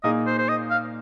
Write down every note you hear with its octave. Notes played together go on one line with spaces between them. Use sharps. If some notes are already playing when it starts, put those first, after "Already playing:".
A#2 A#3 D#4 G#4 D#5
C5
C5
D#5
F5